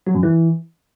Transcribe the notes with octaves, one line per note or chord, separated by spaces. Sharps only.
F#3
F#2
E3